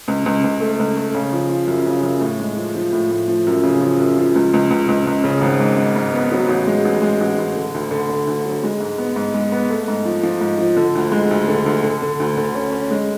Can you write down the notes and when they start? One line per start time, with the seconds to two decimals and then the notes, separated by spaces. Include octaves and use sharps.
0.08 C#2
0.26 C#2
0.44 C#2
0.60 A3
0.79 C#2
0.97 A3
1.15 C#3
1.33 F3
1.49 F3
1.67 F#2
1.86 C#3
2.03 F#2
2.21 A2
2.40 G#3
2.56 F3
2.75 F3
2.92 A2
3.11 A2
3.28 F3
3.47 F#2
3.63 C#3
3.81 F3
3.99 F#2
4.17 F3
4.35 C#2
4.54 C#2
4.71 C#2
4.88 C#2
5.07 C#2
5.24 C#3
5.41 G#1
5.60 G#2
5.77 G#2
5.96 G#2
6.13 B3
6.32 F#3
6.49 A1
6.67 G#3
6.85 A1
7.02 G#3
7.21 A1
7.38 A1
7.56 D3
7.74 D2
7.91 D3
8.09 D3
8.27 D2
8.45 F#3
8.63 G#3
8.80 G#2
8.98 B3
9.16 G#2
9.34 G#3
9.52 B3
9.70 A3
9.88 G#2
10.05 F3
10.23 F3
10.41 G#2
10.59 F3
10.76 D3
10.95 D2
11.12 G#3
11.31 D2
11.48 D3
11.66 D2
11.83 D3
12.02 D3
12.20 D2
12.37 D3
12.55 C#4
12.72 C#4
12.91 G#3